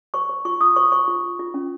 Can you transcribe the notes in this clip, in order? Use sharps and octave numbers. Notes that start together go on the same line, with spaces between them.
C5 C#6
C5
F4 C#6
F4 D#6
C5 C#6
C5 C#6
F4
F4
F4
C#4